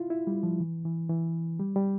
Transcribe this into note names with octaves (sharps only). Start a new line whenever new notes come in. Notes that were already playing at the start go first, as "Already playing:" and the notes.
Already playing: E4 F4
E4
G3
F3
E3
E3
E3
G3
G3